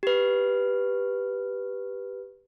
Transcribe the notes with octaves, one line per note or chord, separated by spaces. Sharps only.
G4 B4